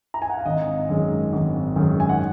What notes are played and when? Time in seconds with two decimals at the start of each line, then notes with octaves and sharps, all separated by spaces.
0.14 A#5
0.22 G#5
0.30 F#5
0.37 F5
0.45 G#1 D#5
0.89 F#2 D#3 G#3
1.33 G#1
1.76 F#2 D#3 G#3
2.00 G#5
2.09 F#5